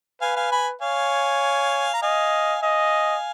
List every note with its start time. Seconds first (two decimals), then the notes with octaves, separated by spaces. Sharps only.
0.21 B4 F5 G#5
0.36 F5 G#5
0.52 G#5 B5
0.81 C#5 F5 G#5
1.93 A#5
2.02 D#5 F5 G#5
2.62 D#5 F5 G#5